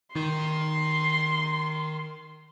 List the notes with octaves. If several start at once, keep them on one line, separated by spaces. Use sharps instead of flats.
D#3 C6